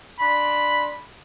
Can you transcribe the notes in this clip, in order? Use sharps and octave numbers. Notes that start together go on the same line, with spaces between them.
D4 B5 C6